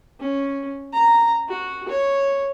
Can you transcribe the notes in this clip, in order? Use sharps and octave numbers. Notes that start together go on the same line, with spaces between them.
C#4
A#5
F#4
C#5